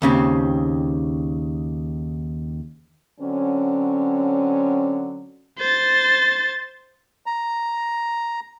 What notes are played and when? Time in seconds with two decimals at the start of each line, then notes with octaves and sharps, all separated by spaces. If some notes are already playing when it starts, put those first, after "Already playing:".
0.02 D#2 C#3 C4
3.19 D3 F#3 C4 C#4
5.59 C5 A6
7.26 A#5